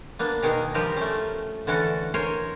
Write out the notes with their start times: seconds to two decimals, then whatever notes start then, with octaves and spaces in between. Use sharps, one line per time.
0.19 A#3 B3 D4
0.42 B2 D#3 G#4 A#4
0.74 F3 G3 G4 A#4
0.97 A3 C#4
1.67 D3 E3 C#4 F#4 A4
2.14 A#4 C5 C#5 G#5